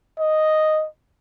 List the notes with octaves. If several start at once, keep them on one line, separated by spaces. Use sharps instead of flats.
D#5